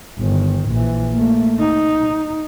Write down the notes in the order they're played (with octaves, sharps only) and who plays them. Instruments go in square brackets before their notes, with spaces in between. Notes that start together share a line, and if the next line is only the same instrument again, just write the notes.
[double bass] G1 D#3
A#1 E3
A3 A#3
D#4